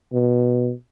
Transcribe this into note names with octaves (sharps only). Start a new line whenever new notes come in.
B2